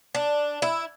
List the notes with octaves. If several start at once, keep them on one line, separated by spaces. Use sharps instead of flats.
D4
E4